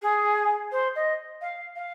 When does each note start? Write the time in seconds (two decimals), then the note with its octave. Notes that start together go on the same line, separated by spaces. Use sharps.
0.02 G#4
0.72 C5
0.95 D#5
1.41 F5
1.76 F5